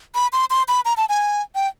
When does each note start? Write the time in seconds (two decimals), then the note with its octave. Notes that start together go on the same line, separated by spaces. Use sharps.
0.15 B5
0.33 C6
0.50 C6
0.68 B5
0.85 A#5
0.97 A5
1.09 G#5
1.55 G5